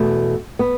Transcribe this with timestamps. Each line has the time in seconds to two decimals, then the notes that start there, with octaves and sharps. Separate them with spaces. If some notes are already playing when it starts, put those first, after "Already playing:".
Already playing: E2 B2 A3
0.59 B3